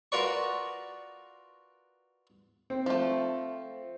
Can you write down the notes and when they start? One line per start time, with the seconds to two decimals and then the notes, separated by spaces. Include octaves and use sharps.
0.12 F4 F#4 A#4 B4 D5 C#6
2.70 C4
2.86 F3 A3